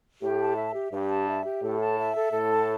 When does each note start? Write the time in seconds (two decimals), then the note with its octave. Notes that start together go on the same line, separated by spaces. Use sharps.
0.21 A2 G4
0.39 A5
0.56 E5
0.74 G4
0.92 G2 G4
1.10 A5
1.27 E5
1.44 G4
1.62 A2 A4
1.80 A5
1.98 E5
2.15 A4
2.33 A2 A4
2.51 A5